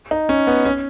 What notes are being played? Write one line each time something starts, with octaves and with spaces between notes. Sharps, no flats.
D#4
C#4
B3
C#4